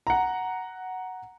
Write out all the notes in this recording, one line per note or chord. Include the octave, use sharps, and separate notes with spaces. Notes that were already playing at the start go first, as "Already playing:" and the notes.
F#5 A#5